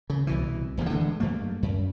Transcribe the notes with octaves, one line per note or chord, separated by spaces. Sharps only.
C#3
C2 B2 E3
D#1 E2 C3 A#3
D3 E3 G#3 A3
G2 F#3 A3 A#3
F#2